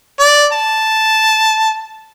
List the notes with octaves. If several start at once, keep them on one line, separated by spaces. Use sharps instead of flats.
D5
A5